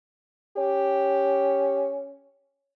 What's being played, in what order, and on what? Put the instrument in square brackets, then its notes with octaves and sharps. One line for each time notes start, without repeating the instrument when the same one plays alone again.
[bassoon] C#4 [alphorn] G4